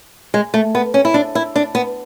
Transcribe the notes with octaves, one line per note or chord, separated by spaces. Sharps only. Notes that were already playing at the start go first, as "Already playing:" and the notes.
G#3
A3
B3
C#4
E4
D4
E4
D4
B3